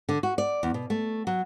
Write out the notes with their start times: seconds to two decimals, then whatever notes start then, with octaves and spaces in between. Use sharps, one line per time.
0.09 D3
0.23 F#4
0.38 D5
0.63 E2
0.74 B2
0.90 A3
1.27 F#3